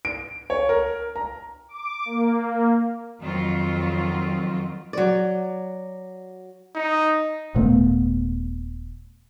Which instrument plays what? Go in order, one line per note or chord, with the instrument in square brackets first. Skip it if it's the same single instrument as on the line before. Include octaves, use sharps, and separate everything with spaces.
[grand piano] D7
C#5
A#4
A#5
[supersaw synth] D6
A#3
[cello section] F2 D#3 F#3 C4 F4
[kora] F#3 D5
[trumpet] D#4
[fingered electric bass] D#1 A#2 A3 B3